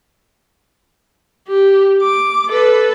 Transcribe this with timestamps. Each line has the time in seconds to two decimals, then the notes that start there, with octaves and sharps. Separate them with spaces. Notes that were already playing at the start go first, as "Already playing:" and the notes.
1.48 G4
2.03 D6
2.49 A4 B4